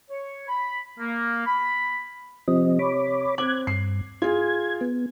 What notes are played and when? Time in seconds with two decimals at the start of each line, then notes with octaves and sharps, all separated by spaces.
0.10 C#5
0.48 B5
0.98 A#3
1.46 B5
2.48 C3 F3 C4 D#5
2.79 C#5 B5 D6
3.38 C4 D6 F#6 G#6
3.67 G2 C7
4.22 F4 G#4 G#6
4.81 B3